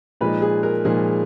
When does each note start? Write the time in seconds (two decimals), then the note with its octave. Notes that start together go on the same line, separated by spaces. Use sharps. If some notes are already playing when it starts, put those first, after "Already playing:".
0.21 A#2 F3 G#3 D#4 B4
0.42 G#4
0.63 A#4
0.84 A#2 F3 G#3 D#4 G#4